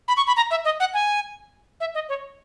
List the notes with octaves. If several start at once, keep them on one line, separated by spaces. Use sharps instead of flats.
B5
C#6
B5
A#5
E5
D#5
F#5
G#5
E5
D#5
C#5